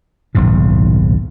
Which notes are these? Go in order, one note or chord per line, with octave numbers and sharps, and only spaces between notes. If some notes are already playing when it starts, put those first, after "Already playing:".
D#1 B1 G#2 C#3